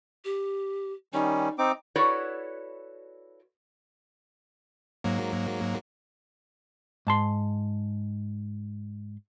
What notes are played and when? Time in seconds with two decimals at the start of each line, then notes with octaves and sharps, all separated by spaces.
0.25 G4
1.14 D#3 G3 C#4 D#4
1.58 C4 D#4 D6
1.96 E4 F#4 A4 B4 C#5 D5
5.04 G#2 F#3 A#3
7.07 G#2 A5 C6